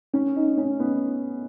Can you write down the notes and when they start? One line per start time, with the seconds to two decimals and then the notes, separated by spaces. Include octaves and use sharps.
0.14 C#4
0.36 D#4
0.57 C#4
0.80 B3